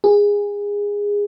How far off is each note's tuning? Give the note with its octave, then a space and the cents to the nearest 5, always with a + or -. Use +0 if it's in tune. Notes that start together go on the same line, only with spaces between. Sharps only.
G#4 -20